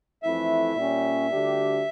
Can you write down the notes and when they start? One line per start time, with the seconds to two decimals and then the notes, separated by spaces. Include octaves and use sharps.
0.23 F2 E3 A3 E4 E5
0.76 A#2 G3 C#4
1.30 D2 D3 G3 D4 G4